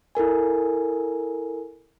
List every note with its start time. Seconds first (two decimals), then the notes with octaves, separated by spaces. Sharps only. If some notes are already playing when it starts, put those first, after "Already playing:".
0.15 E4 A4 A#4 G#5